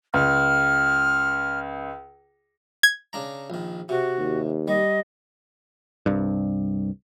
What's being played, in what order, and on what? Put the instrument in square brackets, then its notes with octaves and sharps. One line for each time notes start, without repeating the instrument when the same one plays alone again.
[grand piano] C#2 [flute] F6
[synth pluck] G#6
[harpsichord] C#3 D4 A#5
A#1 D#3
[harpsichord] C3 [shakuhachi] F#4
[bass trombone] D#2
[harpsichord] G3 [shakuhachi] D#5
[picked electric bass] C2 G2